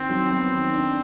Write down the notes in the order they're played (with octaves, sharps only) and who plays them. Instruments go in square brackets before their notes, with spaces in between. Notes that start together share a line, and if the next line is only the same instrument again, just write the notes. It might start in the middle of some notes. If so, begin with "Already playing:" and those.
Already playing: [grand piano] D#3 [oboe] C4
[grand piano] F#3
[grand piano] B3 [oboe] C4
[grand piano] D#3
D4